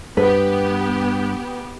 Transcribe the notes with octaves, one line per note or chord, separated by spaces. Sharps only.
G2 B3 G4 B4